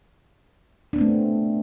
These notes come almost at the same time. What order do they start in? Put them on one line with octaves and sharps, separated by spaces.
D4 B3 C4 A3